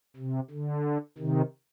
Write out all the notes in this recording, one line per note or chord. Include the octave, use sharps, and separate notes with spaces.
C3
D3
C3 D#3